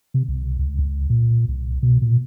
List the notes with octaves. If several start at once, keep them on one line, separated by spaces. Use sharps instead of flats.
C3
C2
C#2
C#2
A#2
C2
B2
A#2